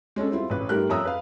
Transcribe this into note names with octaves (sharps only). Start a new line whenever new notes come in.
G#3 C#4 D4 A4
G3 C4 E4 F4
A1 B4
G#2 G3 A3 G4 A#4 F#6
F2 C#5 E5 A#5 D#6 E6
B4 F5